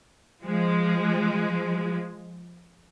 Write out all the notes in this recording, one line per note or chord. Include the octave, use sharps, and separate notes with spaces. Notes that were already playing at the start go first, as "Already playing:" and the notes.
F3 G#3